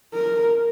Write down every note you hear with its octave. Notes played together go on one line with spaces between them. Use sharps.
A#4